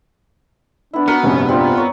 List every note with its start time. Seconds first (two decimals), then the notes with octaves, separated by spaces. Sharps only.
0.93 B3 D4 E4
1.08 B3 F#4 A#4 C#7
1.23 F1 A#1 G2 C#4
1.49 G3 C4 F4
1.77 A#4 C#5